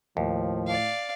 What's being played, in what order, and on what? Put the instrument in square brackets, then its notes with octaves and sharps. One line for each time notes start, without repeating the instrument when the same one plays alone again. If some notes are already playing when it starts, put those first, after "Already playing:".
[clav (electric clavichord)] D#2 [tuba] A2 [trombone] F3
[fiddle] D5 F5